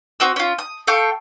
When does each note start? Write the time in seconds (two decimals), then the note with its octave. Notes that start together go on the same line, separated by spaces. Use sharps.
0.20 C4 F#4 D#6 E6
0.36 C#4 F4
0.58 D#6
0.87 A4 F5 G5 C#6